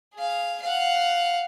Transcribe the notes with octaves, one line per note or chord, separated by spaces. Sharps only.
G#4 F5
F5 F#5